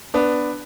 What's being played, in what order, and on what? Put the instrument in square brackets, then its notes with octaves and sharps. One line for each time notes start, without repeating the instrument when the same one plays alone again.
[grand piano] B3 D4